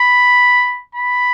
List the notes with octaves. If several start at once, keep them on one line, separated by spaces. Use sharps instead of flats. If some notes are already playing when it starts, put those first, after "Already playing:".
Already playing: B5
B5